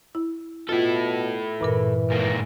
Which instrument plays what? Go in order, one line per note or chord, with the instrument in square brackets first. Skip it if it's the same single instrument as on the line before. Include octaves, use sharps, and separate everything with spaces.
[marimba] E4
[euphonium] B2 [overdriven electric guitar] E4 A4 [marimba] F4
[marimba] G2 A#2 A#4 [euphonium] E3
[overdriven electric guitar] G#2 A#3